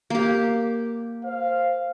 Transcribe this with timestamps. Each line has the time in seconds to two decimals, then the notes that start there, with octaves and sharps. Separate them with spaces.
0.10 A#3 G4
1.25 C5 F5